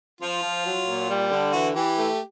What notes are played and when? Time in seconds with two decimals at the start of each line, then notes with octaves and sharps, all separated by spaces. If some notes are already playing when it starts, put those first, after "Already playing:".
0.21 F3 F4
0.43 F3
0.66 F#3
0.87 A#2
1.09 G3
1.31 D3
1.53 E3 F#4
1.75 E3 G4
1.97 A3